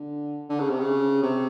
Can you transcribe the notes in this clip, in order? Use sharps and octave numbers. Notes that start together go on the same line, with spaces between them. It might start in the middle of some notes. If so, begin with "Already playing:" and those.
Already playing: D3
D3
C#3
C3
C#3
C3